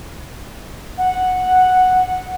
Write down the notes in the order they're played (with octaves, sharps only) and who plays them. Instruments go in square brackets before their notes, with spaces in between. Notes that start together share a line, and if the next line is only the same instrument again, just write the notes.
[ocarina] F#5